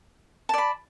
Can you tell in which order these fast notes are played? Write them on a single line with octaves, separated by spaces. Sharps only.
A5 D5 B5